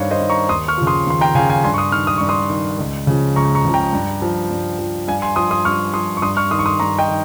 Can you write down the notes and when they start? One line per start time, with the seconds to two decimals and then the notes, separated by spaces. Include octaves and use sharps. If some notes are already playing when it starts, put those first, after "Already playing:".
Already playing: G2 D#3 C5 C#5 F5
0.11 C5 D#5
0.21 D#3
0.30 A#5 C#6
0.49 D#2 C6 D#6
0.68 C#6 F6
0.78 C#3 F3
0.87 C6 D#6
1.07 D#2 C6
1.21 G5 A#5
1.35 C#3 F3 F5 G#5
1.50 F5 G#5
1.64 G2 G#5 C6
1.74 C#6
1.78 C6 D#6
1.92 D#3 C#6 F6
2.07 D#6
2.18 G2 C#6
2.29 C6 D#6
2.50 D#3
2.79 C#2
3.07 C#3 F3
3.36 C#2 A#5 C#6
3.55 A#5 C#6
3.65 C#3 F3
3.74 G5 A#5
3.93 G2
4.22 F3
4.51 G2
4.79 F3
5.08 G2 F5 G#5
5.22 G#5 C6
5.36 F3 C6 D#6
5.51 C6 D#6
5.65 G2 C#6 F6
5.94 F3 C6 D#6
6.17 C#6
6.22 G2 C6 D#6
6.37 C#6 F6
6.51 D#3 C6 D#6
6.59 C#6
6.66 C6 D#6
6.80 G2 A#5 C#6
6.99 D#5 G5
7.08 D#3